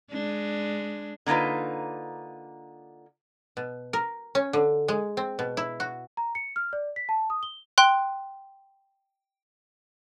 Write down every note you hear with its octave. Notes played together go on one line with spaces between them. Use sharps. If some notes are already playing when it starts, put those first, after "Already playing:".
G#3 D4
D3 A#3 D#4 F4 B4
B2
A#4
C#4
D3
G#3
C4
B2
E4
F#4
A#5
C#7
F6
D5
B6
A5
D#6
G7
G5 C6 F#6